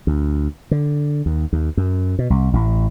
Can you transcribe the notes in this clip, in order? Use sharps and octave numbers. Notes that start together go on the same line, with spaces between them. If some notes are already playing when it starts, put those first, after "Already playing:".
D2
D3
D#2
D#2
F#2
B2
C2
A1